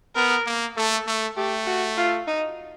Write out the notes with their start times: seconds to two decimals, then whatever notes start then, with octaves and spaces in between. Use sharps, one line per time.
0.16 B3 A#4
0.46 A#3
0.77 A3 A4
1.07 A3
1.37 A3 G4
1.66 F#4
1.97 F4
2.27 D#4